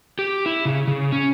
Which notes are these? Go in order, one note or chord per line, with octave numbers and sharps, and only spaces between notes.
G4
E4
C#3
C#3
C#4